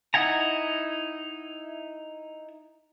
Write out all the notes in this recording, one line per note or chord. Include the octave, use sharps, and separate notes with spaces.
D#4 E4 F#5 G#5 A#5